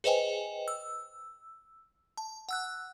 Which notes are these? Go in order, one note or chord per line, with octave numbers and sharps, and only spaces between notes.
G#4 B4 C5 D#5 G5 G#5
E6
A5
F#5 E6 F#6